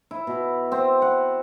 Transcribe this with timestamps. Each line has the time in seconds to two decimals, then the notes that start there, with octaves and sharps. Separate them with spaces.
0.11 E4
0.27 B2
0.72 C4
1.02 F#5